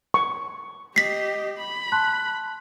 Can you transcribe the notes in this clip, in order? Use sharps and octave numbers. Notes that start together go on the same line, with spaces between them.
C#6
G4 D#5 B6 C7
B5
A5 C6 F#6